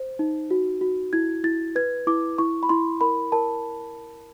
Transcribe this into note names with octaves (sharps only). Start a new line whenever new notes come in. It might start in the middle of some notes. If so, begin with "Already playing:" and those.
Already playing: C5
D#4
F#4
F#4
E4 G#6
E4 A6
B4 G#6
E4 D6
E4 C#6
B5
E4 C6
A#4 B5
A#4 A5